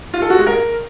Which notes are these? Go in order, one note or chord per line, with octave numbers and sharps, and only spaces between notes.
F4
A4
F#4
G#3
A#4